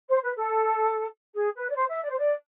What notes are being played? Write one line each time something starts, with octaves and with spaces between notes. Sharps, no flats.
C5
B4
A4
G#4
B4
D5
C5
E5
D5
C5
D5